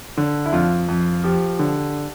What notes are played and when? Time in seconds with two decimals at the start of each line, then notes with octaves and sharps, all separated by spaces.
0.18 D3
0.46 E4
0.53 F2 F4
0.88 F2
1.24 F3 G4
1.59 D3